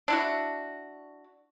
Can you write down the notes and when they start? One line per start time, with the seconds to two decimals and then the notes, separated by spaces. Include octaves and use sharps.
0.08 D4 E4 F#4